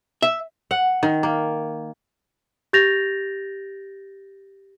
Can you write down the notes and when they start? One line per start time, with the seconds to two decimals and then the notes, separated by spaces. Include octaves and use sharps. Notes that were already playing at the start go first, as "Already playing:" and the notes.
0.22 E5
0.71 F#5
1.03 D#3
1.23 A#3
2.73 G4 G6 A6 A#6 F7